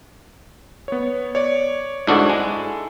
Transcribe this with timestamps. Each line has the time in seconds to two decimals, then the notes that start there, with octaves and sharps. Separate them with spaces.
0.88 B3 C#5
1.35 C#5 D5
2.07 G#2 D4 E4 F#4 A4
2.30 G#3